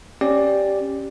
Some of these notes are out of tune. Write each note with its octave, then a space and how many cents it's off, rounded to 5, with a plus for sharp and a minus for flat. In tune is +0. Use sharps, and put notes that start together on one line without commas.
C#4 -10 G4 +0 D5 +0